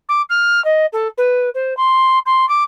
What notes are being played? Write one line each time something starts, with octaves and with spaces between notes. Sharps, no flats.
D6
F6
D#5
A4
B4
C5
C6
C6
D6